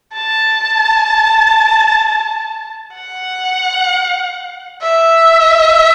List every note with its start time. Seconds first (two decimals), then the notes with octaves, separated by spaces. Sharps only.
0.14 A5
2.95 F#5
4.82 E5